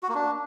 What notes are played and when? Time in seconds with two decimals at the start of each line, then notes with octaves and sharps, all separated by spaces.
0.03 F#4
0.09 A#3
0.15 D4